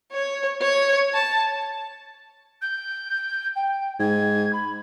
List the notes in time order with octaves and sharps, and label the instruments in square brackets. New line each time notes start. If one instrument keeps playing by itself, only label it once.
[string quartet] C#5
C#5
A5
[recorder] G6
G5
[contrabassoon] G#2 [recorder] G#6
[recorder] B5